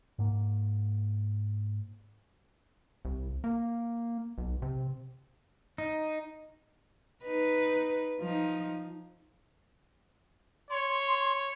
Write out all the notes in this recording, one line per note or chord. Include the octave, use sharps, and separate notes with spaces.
G#2 A#3
C2
A#3
B1
C3
D#4
D#4 B4
F3 D#4
C#5 C6